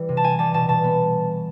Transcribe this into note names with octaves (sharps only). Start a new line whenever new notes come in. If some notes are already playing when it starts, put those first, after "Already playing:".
Already playing: E3 G3
C3
A5
B3 G#5
G3 A5
B2 A5
B2 A5
B3